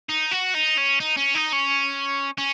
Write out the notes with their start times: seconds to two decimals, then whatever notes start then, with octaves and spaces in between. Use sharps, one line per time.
0.09 D#4
0.32 F#4
0.55 D#4
0.78 C#4
1.00 D#4
1.17 C#4
1.35 D#4
1.52 C#4
2.38 C#4